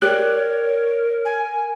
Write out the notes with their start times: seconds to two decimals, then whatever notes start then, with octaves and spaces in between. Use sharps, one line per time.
0.02 G4 A#4 C#5 D5 F#6
1.25 G#5